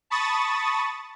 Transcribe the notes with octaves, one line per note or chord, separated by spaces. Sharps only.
A5 B5 C#6 D#6 A6